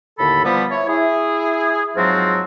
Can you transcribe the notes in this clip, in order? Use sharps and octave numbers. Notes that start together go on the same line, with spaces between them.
D#2 A2 D3 A4 B5
F3 G3 B3
E4 C#5
E4 G#4
G#2 F3 F#3 C4 F4 F#4